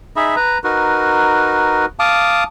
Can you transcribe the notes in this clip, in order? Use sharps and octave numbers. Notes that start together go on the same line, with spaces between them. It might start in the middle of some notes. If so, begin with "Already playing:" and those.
D#4 G#4 E5 B5
B4 A#5
D#4 F#4 A#4 B4
F5 A5 D6 D#6